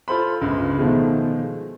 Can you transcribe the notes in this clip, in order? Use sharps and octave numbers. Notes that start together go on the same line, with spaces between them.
F4 A4 C5 B5
G1 C#2
B2 D#3 F3 G#3 A3